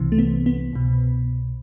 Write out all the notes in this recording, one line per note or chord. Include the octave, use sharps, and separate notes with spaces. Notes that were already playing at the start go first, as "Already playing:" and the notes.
Already playing: C2 C3 E3
A3
B3
B3
C2 B2